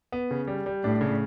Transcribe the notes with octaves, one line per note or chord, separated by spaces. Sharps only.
B3
C#3
G3
G3
A2 D4
C#3